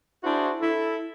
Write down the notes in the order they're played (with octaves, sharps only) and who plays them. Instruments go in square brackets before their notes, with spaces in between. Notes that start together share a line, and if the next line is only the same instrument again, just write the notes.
[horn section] D4 E4 F#4 G#4 C5
E4 A4